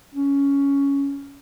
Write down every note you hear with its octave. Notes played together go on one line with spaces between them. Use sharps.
C#4